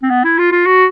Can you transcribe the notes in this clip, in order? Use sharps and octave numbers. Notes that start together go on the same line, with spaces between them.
C4
B3
E4
F4
F4
F#4